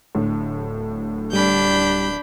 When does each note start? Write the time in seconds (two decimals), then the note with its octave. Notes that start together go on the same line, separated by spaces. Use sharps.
0.15 D1 A2 D3
1.33 G3 D4 B5 G6